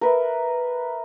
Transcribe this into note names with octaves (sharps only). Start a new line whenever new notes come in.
A#4 B4 E5